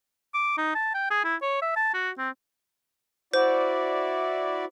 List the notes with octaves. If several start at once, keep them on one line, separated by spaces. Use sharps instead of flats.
D6
D#4
A5
G5
G#4
E4
C#5
E5
A5
F#4
C4
E4 F#4 C5 D5